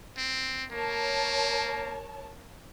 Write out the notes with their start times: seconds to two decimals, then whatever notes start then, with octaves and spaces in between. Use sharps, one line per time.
0.17 C4
0.71 A#3 A#4 C#5 A5